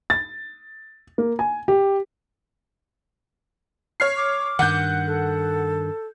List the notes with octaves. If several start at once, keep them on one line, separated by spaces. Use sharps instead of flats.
A6
A#3
G#5
G4
C#5 F6 C7
D6
G2 D#3 F#5 F#6 G6
A4